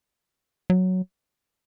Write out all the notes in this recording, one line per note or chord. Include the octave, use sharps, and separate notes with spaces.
F#3